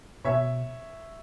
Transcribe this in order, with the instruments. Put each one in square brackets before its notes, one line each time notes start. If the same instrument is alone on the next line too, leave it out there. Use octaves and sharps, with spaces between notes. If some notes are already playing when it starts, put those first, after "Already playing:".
[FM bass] B2 [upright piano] C#5 E5